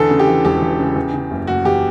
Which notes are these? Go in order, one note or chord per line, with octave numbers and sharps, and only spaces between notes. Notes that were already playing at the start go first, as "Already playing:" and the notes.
Already playing: E2 D3 A4
C#3
G4
E3
E1 G4
E2
C#3
E2
C#3
F#1
F#1 F#4
E2 G4